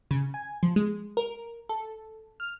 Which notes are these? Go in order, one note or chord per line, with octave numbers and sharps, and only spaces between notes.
C#3
G#5
F3
G#3
A#4
A4
F6